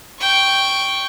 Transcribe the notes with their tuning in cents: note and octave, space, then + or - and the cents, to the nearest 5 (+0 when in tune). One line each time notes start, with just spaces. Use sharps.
G5 +0 C#6 +0